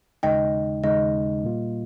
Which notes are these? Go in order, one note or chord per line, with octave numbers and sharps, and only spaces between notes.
D#2 C#3 G#3 D#4 D#5 G5
D#2 C#3 G#3 D#4 D#5
A#2 G3 A#3 F4